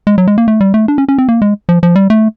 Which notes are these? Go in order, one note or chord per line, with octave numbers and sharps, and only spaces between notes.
G#3
F#3
G#3
A#3
A3
G3
A3
D4
C#4
C#4
C4
A#3
G#3
F3
F3
G3
A3